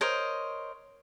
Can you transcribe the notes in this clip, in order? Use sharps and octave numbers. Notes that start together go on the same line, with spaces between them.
A#4 C5 C#5 D#5